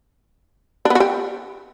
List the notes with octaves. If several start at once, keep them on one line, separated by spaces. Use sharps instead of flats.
D4
B3
F#4
G4